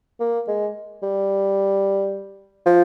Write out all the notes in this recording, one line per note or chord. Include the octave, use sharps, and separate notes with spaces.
A#3
G#3
G3
F3